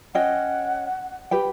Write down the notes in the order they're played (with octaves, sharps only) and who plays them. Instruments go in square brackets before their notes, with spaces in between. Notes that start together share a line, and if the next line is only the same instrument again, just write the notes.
[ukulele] C#4 D#5 G5 [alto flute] F#5
[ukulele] G4 B4 G5